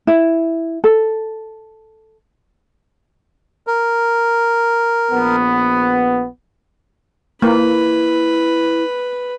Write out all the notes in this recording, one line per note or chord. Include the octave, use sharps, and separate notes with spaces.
E4
A4
A#4
A#1 B3
A#3 E4 B4